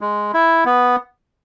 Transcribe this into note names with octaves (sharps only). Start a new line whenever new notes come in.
G#3
E4
B3